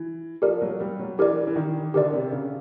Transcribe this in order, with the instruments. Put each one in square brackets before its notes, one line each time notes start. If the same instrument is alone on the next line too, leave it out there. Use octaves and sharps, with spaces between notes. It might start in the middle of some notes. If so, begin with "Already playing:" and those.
Already playing: [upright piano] E3
[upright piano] F3 [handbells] G4 A#4 D5
[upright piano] F#3
G3
F#3
[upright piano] E3 [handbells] G4 A#4 D5
[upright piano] E3
D#3
[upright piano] D3 [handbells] G4 A#4 D5
[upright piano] C3
C#3